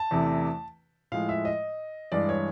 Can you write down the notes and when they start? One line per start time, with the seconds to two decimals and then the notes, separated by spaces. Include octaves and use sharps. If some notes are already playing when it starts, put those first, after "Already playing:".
Already playing: A5
0.11 E2 C3 E3 A3
1.12 A2 F3 G#3 F5
1.29 E5
1.45 D#5
2.12 G2 E3 G#3 D5
2.29 C#5